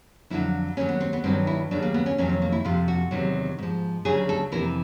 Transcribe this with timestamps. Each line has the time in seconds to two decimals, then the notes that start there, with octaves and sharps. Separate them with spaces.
0.30 F2 D3 F#3 E4
0.77 D#2 D#3 F#3 C#4
0.89 B3
1.01 C4
1.13 B3
1.24 G2 D#3 F#3 C4
1.47 E4
1.71 D#2 C#3 F#3 D4
1.82 A#3
1.94 B3
2.06 C#4
2.18 F2 C3 D#3 F#3 C#4
2.29 C4
2.42 A#3
2.52 E4
2.65 F2 C3 F3 F4
2.88 F#4
3.11 E2 C3 D#3 F#3
3.58 G#2 F3
4.05 D2 C#3 F#3 G#4
4.29 A4
4.52 F2 C3 E3 A#4